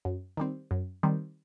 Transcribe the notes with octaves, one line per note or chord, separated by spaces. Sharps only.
F#2
D#3 G3 C4
F#2
D#3 G3 C4